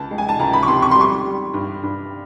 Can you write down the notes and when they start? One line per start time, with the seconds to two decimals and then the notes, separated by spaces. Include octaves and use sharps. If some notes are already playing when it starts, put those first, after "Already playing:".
Already playing: C#2 A5
0.11 G#3
0.18 G#5
0.29 A5
0.39 C#2 A#5
0.53 B5
0.63 C#6
0.68 C3 C6
0.82 C#6
0.91 C6
0.96 G3 C#6
1.25 G3
1.54 G2
1.83 G2